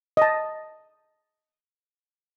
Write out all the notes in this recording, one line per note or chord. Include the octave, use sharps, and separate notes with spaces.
D#5 A5